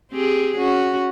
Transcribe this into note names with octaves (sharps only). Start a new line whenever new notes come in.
C4 G4 G#4
C#4 F#4